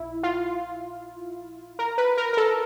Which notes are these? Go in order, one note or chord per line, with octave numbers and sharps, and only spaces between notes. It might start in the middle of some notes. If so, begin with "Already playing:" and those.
Already playing: A#1 E4
F4
A#4
B4
A#4
A#4
A4